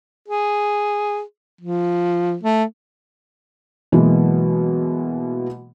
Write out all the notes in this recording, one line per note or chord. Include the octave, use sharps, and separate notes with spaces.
G#4
F3
A3
B2 E3 F#3 G#3 A#3